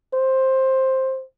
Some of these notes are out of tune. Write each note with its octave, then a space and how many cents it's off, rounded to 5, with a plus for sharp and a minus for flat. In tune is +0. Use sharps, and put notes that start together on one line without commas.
C5 +10